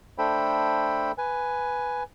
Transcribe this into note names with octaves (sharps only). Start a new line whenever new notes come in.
A3 D4 A4 C5 G5 B5
B4 G#5